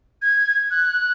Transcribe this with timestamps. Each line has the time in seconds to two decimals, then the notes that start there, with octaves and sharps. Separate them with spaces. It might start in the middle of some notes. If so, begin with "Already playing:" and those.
0.22 G#6
0.71 F#6